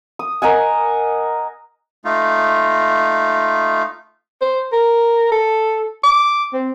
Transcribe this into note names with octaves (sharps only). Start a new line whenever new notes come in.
D#6
A#4 D#5 F#5 G#5
A3 D#4 F4
C5
A#4
A4
D6
C4